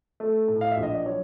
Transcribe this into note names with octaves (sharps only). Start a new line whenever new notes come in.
A3
A2
F5
E5
A#1
D#5
D5
F#3 C#5